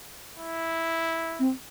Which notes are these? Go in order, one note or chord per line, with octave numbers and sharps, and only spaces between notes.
E4
C4